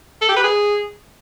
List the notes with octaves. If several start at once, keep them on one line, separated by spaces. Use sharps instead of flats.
A4
G4
B4
G#4